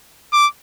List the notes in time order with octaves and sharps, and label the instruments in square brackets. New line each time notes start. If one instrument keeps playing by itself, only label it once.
[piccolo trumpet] D6